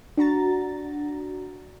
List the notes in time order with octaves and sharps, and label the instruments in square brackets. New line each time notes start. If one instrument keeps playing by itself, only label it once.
[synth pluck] D4 F#4 A#5 A6